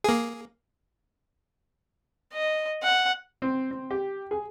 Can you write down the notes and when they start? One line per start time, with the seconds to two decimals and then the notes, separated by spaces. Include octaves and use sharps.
0.04 A#3 G#4
2.33 D#5
2.83 F#5
3.42 C4
3.71 C4
3.90 G4
4.31 G#4